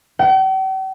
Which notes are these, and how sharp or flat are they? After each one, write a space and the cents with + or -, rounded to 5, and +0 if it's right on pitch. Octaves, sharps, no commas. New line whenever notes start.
G5 -45